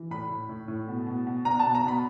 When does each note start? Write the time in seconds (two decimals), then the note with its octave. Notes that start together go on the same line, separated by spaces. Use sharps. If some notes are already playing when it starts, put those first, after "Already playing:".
Already playing: E3
0.10 A2 B5
0.30 A2
0.49 A2
0.68 A2
0.88 B2
1.06 B2
1.27 B2
1.45 B2 A#5
1.60 B2 A5
1.75 A#5
1.84 B2 B5